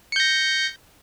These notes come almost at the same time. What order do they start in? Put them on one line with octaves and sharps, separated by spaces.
C#7 G6 A#6